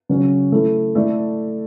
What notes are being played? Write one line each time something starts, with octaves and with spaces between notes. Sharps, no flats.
C#3 F#3 C#4
A3 E4 A4
A3 E4 A4 D5